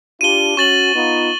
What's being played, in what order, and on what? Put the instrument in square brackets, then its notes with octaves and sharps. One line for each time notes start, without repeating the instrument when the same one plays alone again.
[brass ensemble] D4 F4 G4 [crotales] D#7 G7
[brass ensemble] C#4 F#4 [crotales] C#6 A6 F#7
[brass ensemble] B3 D#4 F4